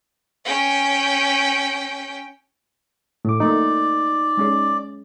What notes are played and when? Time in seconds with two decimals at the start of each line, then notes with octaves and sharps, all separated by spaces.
0.45 C#4 G5
3.25 A2 A3 D6
3.40 F3 A3 A#3 D#4 D5
4.37 G#3 C#4 G#4